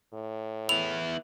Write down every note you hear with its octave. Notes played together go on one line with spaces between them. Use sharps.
A2
B3 E4 F7